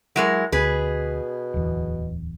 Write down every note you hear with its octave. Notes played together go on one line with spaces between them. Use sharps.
F#3 G#3 E4 A#4
D2 B2 G#4 B4
D1 E2